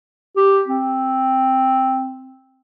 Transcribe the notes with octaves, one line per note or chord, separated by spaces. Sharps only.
G4
C4